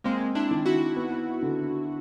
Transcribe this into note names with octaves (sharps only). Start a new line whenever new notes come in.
G#3 A#3 C4
D4 E4
D#3
E4 F#4
B3
D3